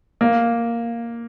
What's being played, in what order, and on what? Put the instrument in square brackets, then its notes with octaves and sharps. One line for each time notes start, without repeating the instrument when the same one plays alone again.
[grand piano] A#3